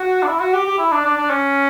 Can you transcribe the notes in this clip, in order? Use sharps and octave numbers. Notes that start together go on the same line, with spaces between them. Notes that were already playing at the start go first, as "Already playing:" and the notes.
Already playing: F#4
D4
E4
F#4
G4
G4
E4
D4
D4
D4
C#4